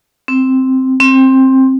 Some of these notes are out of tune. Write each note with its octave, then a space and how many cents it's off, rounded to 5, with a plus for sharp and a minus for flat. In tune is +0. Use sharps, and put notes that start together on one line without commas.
C4 +0
C4 +15